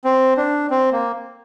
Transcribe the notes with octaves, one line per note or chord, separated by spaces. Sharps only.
C4
D4
C4
A#3